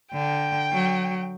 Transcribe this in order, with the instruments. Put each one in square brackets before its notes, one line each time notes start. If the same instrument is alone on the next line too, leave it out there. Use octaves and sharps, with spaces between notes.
[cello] D3 [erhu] G5
[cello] F#3